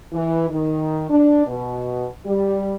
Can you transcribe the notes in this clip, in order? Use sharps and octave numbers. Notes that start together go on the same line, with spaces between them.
E3
D#3
D4
B2
G3